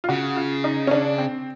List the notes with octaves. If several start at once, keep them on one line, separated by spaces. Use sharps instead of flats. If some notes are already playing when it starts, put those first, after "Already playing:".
F4
C#3 F#4
F4
D#4
C#4
D4
C4